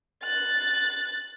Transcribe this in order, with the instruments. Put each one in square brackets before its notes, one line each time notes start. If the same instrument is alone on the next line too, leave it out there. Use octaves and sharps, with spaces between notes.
[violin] F#6 A6